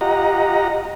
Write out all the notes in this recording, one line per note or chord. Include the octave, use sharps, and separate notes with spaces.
F4 G4 D#5 F#5 A#5